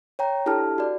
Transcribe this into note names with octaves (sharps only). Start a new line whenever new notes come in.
C#5 G5 A#5
D4 E4 G4 A4 A5 F6
F#4 D5